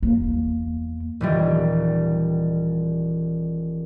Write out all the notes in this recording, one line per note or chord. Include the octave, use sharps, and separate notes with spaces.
E2 A#3
D#1 E3 G3